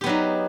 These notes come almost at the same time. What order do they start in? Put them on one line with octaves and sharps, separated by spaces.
G4 B3 F#3 D#4